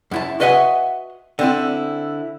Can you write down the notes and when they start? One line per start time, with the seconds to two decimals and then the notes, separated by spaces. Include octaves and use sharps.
0.11 F#2 E4 A5
0.40 F#4 B4 D#5 E5 F#5 G#5
1.39 D3 C4 E4